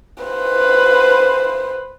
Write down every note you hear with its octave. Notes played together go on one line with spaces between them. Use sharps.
B4 C5